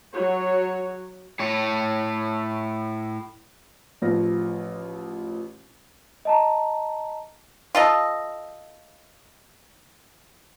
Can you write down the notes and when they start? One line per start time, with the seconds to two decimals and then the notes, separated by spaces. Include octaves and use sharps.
0.14 F#3 F#4 C#5
1.40 A2 C#5
4.02 A1 F3 F4 A#6
6.25 D#5 A5 A#5
7.75 F4 A4 D#5